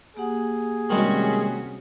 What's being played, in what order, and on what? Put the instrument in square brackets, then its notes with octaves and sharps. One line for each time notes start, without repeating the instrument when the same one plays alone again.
[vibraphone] A#3 G4 F#5 [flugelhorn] G#4
[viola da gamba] C3 C#4 F#4 [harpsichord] D#3 G3 G#3